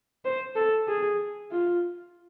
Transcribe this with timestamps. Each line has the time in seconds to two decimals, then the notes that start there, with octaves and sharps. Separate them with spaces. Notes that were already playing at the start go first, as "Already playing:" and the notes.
0.25 C5
0.56 A4
0.88 G#4
1.51 F4